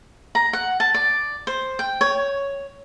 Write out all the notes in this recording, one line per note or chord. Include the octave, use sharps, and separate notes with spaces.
A#5
F#5
A5
D5
C5
G5
C#5